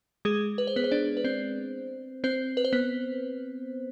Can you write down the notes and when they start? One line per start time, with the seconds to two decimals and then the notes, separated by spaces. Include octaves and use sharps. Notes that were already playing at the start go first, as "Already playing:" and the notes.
0.25 G#3 G#4
0.58 B4
0.67 C5
0.76 B3 B4
0.84 C5
0.91 D4 D5
1.17 B4
1.24 C4 C5
2.24 C4 C5
2.57 B4
2.64 C5
2.73 B3 B4